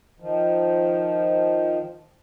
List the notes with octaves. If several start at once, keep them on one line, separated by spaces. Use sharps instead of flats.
D#3 F3